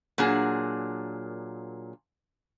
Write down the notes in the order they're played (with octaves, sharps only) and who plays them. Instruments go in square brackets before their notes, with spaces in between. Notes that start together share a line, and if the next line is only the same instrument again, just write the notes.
[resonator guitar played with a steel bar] A#2 F#3 A#3 D4 G#4